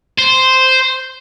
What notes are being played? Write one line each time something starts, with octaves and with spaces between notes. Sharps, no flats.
C5